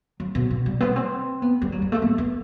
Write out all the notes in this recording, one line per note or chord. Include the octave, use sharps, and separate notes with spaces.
F#3
B2
B2
G3
B3
C4
B3
G3
F#3
G3
A3
B3
B3